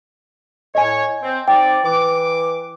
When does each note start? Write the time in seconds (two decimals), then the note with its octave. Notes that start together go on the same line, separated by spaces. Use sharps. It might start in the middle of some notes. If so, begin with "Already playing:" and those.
0.75 A2 C#5 D#5 G#5
1.22 C4
1.48 C4 D#4 D5 G5
1.84 E3 D6